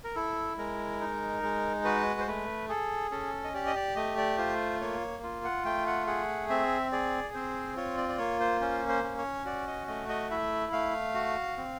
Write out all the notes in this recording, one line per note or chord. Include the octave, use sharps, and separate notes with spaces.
A#4
E4 A4
G#3 A#4
D#4
G#3
F#4 B4
C5
A3 B4
G#4 A4
C#4 A4
D#5
G4 D5
D#5
D5
A3 D#5
D5
F4 C5
A#3 C#5
F4
F#5
A3 G5
F#5
G#4 F#5
C4 E5
G#4 D5
C4 C5
F4 C#5
D5
D5
A#3 C#5
C5
C#4 C5
C5
C#4
C#5
F#4 D5
D#5
A3 D#5
D#5
E4 E5
A3 F5
F#4
C4